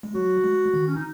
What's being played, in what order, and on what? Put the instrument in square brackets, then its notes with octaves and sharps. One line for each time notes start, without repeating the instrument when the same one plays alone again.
[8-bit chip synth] G#3
[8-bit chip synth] F#3 [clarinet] F#4
[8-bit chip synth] G#3
D#3
[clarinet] C#4
D#4